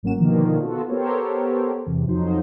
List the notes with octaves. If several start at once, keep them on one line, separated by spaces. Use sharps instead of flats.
G#1 F#3 A#3 C#4 F#4 E7
B2 D3 D#3 F3 A#3
B3 F4 F#4 A4
B3 G4 A4 A#4 C5 C#5
E2 C3
F2 F3 F#3 D#4 C5